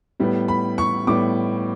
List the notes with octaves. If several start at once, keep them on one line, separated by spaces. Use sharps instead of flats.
A2 G3 B3
B5
C#6
A2 G3 B3 D6